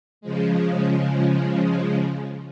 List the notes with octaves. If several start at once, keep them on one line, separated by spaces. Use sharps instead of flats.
C#3 F3 G#3